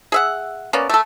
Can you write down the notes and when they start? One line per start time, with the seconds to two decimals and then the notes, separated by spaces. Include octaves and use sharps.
0.12 G#4 E5 F#5
0.73 A#3 B3 C#4 D5
0.89 A3 A4